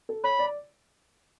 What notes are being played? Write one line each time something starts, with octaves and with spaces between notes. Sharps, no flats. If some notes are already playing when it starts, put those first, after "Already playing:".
A4
C#5 B5
D5